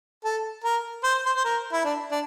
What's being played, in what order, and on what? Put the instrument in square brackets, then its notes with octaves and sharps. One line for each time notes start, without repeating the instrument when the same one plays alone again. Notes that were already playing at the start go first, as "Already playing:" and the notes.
[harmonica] A4
A#4
C5
C5
C5
A#4
E4
D4
D4